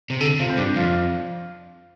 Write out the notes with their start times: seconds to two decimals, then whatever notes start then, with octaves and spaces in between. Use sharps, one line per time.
0.10 C3
0.21 D3 A4
0.39 C3 F4
0.49 C4
0.57 G2 D4
0.76 F2 F4